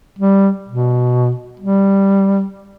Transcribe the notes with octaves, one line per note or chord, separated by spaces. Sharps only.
G3
B2
G3